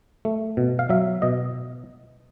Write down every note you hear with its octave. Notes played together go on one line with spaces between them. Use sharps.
A3
B2
F5
F#3 E5
B2 D#5